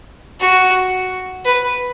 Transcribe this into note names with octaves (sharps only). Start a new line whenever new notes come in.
F#4
B4